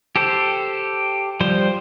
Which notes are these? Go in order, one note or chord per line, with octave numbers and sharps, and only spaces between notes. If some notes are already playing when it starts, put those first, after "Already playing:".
G4 A4 C5
F3 G3 C5